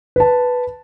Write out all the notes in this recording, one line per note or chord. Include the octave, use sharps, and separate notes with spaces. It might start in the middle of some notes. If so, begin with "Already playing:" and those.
B4 A5